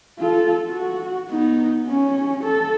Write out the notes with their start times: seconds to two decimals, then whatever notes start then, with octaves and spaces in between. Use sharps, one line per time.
0.19 F4 A4
0.70 F#4
1.30 B3 D#4
1.88 C#4
2.43 A4